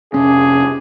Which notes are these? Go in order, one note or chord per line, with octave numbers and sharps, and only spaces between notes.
F1 C3 C#4 D4 G#4